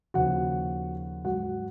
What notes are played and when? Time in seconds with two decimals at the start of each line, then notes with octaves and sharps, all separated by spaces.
0.14 D#2 C#3 F3 F#4 F#5
1.24 G#2 F#3 F#4 F#5